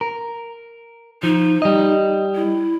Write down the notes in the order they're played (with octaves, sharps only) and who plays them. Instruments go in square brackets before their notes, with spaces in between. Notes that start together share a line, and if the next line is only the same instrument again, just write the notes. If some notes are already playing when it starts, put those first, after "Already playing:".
[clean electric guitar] A#4
[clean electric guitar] F3 [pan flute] D#4
[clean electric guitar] G3 D#5
[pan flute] E4